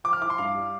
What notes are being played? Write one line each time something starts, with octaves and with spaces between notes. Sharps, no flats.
F3 D6
F6
E4 D6
C6
G2 F5
G3